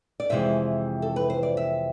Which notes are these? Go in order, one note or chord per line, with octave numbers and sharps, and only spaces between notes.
D5
F2 C3 E3 G#3 E5
A4
B4
C5
D5
E5